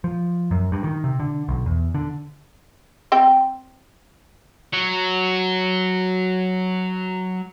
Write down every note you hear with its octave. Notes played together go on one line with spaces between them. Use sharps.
F3
F#2
G2
D#3
C3
D3
B1
E2
D3
C4 G5
F#3 F#4